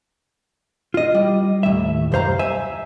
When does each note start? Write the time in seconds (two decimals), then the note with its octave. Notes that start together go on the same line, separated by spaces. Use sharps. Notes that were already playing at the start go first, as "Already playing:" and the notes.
0.94 F4 D#5
1.15 G3
1.63 D#2 A2 E5
2.12 C2 F#2 C5 F5 A#5
2.39 E5 G#5